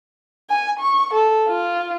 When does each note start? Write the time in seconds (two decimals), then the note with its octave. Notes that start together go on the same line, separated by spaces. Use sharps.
0.50 G#5
0.79 C#6
1.14 A4
1.48 F4